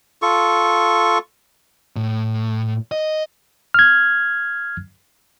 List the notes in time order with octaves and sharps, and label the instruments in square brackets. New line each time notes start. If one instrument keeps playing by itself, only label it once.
[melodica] F4 A4 C#6
[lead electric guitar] A2
D#5
[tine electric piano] F6 G#6